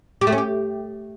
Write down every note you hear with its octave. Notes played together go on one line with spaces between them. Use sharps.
G4
A3
C#4
G4